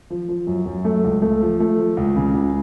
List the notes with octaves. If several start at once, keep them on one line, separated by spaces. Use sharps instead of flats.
F3
F3
F#2
F#2
A3
C#2
A3
F3
A3
F3
C#2
C#3
C#2